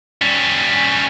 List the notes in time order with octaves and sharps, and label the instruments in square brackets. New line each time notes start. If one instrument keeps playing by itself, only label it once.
[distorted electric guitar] G3 C#4